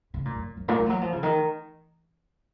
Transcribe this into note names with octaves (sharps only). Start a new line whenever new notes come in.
C#3
A#2
F#2
F#2
A#2
F#3
F3
F#3
F3
C#3
D#3